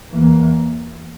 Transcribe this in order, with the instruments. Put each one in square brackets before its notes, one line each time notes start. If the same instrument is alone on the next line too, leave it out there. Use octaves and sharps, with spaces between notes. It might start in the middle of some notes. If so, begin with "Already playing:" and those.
[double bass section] E2 E3 A#3